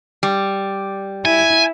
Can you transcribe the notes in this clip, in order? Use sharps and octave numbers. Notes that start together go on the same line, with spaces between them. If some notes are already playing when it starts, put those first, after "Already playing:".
G3
E4 G#5